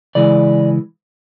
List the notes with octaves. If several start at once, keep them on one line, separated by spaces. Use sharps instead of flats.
C#3 E3 G#3 D5